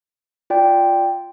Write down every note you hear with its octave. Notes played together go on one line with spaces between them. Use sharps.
F4 D5 G5